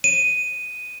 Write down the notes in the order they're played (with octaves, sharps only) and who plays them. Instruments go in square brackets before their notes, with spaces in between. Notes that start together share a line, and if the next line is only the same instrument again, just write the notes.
[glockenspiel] D#7